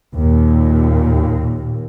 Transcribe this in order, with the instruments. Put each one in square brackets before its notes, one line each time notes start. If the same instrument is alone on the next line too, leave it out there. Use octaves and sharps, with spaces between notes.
[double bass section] D#2 A#2